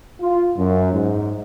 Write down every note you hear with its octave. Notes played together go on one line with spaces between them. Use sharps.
F4
F#2
G#2